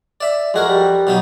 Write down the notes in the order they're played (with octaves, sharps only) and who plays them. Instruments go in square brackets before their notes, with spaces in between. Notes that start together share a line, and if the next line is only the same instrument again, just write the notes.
[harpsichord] D5 E5
[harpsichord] F2 F#4 A#4 [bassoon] G#3
[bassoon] G3
[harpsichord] B2 F#3 D#4